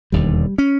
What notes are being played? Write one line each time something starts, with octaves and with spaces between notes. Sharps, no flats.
E1 D#2 D3 G3
C#4